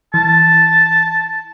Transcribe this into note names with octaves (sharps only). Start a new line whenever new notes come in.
E3 A5